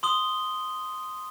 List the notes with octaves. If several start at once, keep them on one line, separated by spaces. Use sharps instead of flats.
C6 D#6 G7